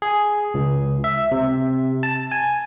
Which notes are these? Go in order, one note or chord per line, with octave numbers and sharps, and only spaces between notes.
G#4
C#2
E5
C3
A5
G#5